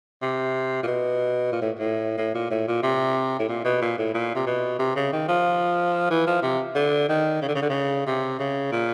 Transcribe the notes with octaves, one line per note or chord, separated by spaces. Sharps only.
C3
A#2
B2
A#2
A2
A2
A2
A#2
A2
A#2
C3
A2
A#2
B2
A#2
A2
A#2
C3
B2
C3
C#3
D#3
F3
E3
F3
C3
D3
D#3
C#3
D3
C#3
D3
C#3
C3
C#3
A#2